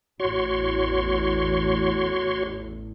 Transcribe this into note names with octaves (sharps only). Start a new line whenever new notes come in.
A1 E2 A2 F#4 C#5 C6